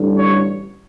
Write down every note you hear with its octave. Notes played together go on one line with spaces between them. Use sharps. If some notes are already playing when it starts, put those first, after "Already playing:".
Already playing: A1 G2 D3
C#5